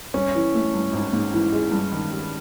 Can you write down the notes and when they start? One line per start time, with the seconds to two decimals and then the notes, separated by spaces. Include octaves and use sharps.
0.14 G2 C#4
0.34 E3
0.54 A3
0.73 G2
0.93 G#1
1.13 G#2
1.33 E3
1.52 G#3
1.71 G2
1.92 D#3
2.11 G3